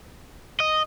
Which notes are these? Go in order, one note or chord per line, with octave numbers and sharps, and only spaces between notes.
D#5